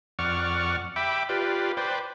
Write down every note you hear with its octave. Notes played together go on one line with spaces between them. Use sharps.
F2 D5 F#5 C#6 F6
E5 G5 B5 D6
F4 G4 B4 D5
B4 C5 D5 G5